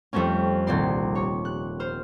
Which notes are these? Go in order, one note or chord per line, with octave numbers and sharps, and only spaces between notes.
F2 G3 A3 C4 C#4
D#1 C2 C4 D5 C6
C#5
F#6
C5 F6